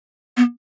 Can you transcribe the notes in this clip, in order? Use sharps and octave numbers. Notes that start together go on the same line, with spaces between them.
B3